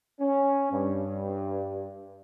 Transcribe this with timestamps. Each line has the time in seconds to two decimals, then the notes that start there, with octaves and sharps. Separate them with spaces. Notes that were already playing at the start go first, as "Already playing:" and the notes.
0.20 C#4
0.72 G2